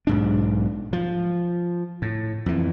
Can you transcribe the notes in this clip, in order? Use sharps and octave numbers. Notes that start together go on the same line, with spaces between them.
B1 G#2 D4
F3
A2
F2 E3